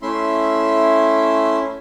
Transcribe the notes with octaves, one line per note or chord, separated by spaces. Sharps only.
A3 C#4 E4 E5 C6